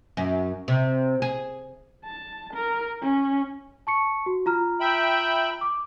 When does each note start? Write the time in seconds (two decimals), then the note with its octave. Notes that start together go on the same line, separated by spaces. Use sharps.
0.17 F#2
0.68 C3
1.22 G#4
2.04 A5
2.54 A#4
3.02 C#4
3.87 A5 C#6 C#7
4.26 F#4
4.46 F4 A#5 F6
4.80 E5 G5 B5
5.61 D6